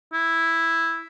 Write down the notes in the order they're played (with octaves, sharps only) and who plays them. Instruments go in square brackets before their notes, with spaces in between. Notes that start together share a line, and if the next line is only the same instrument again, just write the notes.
[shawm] E4